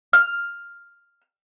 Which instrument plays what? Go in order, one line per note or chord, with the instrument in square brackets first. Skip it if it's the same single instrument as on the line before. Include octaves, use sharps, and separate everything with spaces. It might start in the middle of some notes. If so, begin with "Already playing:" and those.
[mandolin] F6